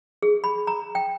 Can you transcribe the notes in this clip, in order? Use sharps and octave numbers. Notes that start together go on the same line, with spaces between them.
G#4
B5
A#5
G5